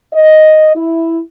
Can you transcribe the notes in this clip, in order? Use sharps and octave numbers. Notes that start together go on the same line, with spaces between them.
D#5
E4